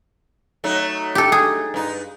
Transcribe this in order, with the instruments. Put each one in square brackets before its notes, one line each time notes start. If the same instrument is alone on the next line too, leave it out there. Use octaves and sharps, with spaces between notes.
[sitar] F#3 A3 D#4
[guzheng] G4 A4
G#4
[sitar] G2 D#4